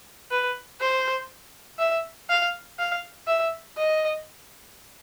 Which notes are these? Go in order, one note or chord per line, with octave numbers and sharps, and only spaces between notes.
B4
C5
E5
F5
F5
E5
D#5